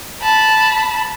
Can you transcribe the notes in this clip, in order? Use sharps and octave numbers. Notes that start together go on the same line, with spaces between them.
A5 B5